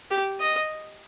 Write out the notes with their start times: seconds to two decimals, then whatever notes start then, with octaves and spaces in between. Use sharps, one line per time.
0.11 G4
0.40 D#5